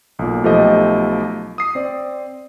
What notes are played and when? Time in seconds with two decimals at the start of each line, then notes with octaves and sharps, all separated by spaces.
0.19 B1 A#2
0.44 B1 F3 A3 G4 A4 D#5
1.58 D#6 C7
1.75 C4 D5